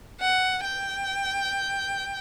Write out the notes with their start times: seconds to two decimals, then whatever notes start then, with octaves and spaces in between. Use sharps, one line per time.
0.21 F#5
0.64 G5